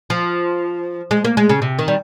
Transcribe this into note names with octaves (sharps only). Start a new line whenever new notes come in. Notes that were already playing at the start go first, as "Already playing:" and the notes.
F3
G#3
A#3
G#3
C#3
C3
D#3
G3